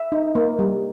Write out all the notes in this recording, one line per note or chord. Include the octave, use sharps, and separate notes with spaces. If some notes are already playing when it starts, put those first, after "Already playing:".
Already playing: E5
D#4
A#3
G3